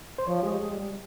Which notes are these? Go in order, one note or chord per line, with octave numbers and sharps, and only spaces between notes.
C5
F3 C#5
G#3 G4
G#3
G3